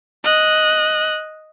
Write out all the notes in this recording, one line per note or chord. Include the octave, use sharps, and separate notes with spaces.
D#5 F#6